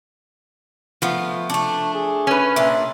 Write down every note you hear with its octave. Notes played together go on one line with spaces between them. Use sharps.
F3 A3 B3
A3 D4 A5
G#4
C#4 B4
A#2 D4 E5